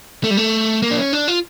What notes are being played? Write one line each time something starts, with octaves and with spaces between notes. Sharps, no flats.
A3
G3
A3
A#3
D4
C#4
D4
F4